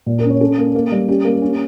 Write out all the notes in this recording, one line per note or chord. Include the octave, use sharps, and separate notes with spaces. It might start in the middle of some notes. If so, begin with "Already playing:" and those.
A#2
A#4
C#4
C#5
C#4 A4
A#3
A#3
G3
C#4 G4
A#3
C#4